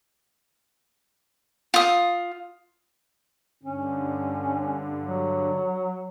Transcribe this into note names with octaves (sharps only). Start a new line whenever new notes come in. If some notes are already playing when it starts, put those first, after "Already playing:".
F4 D#6
G2 D3 C#4
F#3